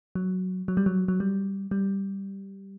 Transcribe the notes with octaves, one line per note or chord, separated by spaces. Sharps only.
F#3
F#3
G3
F#3
F#3
G3
G3